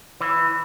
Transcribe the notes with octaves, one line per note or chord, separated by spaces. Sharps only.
E3